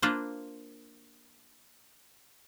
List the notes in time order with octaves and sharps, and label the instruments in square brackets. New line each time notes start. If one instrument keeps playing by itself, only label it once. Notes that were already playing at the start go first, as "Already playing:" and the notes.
[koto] A#3 D4 F4 B4 C5